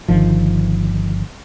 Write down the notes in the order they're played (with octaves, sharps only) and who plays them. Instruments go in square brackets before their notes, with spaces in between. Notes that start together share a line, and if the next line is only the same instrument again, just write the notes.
[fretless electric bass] G1 D#3 F3